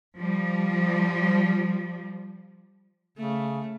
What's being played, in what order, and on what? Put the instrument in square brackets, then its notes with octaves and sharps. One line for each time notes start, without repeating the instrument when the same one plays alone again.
[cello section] F3 G3
[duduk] C#3 [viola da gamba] A3